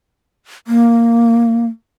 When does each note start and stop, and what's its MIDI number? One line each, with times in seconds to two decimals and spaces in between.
0.67 1.66 58